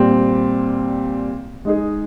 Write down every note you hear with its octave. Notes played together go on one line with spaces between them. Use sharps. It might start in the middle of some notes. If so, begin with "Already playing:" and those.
Already playing: A#2 G3 C4
G#3 D#4 G#4